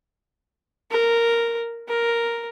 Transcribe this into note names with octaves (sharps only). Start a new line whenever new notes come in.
A#4
A#4